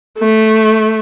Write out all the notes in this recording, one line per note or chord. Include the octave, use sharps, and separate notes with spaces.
A3